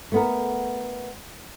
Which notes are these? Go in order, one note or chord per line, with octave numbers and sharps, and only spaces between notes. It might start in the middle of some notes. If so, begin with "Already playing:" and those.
A3 B3 A#4